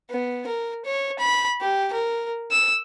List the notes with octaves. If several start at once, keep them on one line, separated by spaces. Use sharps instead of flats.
B3
A#4
C#5
B5
G4
A#4
E6